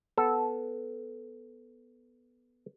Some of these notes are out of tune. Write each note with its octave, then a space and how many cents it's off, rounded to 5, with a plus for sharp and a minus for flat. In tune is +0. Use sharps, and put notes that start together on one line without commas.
B3 +0 A4 -5